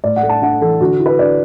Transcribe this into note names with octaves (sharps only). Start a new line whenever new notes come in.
A2 D5
F#5
A3
A5
D4 F#5
E3 A4
D3 F#4
E4
B4
D3 D5